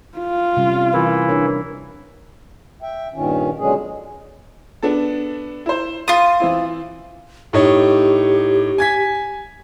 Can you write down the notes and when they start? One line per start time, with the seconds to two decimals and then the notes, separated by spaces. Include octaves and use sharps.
0.18 F4
0.57 C3 G3 C#4
0.93 E3 E4 A#4
1.29 D4 A#4 C#5
2.82 E5 G5
3.14 G2 A#2 D#3 C#4
3.59 B2 D3 F#3 G#3 C#4 G#4
4.82 B3 D4 A4
5.66 E4 C5
6.08 F4 D#6 A6
6.40 E3 C4 E4
7.53 A2 D#4 G4 C#5
8.78 G#5 G#6 B6